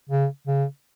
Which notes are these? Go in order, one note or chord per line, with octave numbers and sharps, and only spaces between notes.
C#3
C#3